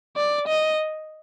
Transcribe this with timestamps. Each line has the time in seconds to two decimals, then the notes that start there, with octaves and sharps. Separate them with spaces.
0.17 D5
0.48 D#5